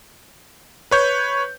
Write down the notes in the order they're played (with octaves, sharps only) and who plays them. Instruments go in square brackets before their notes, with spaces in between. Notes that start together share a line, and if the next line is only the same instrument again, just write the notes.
[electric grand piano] B4 C#5 G6